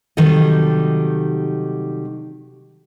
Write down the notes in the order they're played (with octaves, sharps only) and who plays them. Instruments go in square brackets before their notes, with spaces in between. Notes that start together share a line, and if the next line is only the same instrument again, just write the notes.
[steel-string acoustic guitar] C3 D#3 F#3 G3 A4 D#5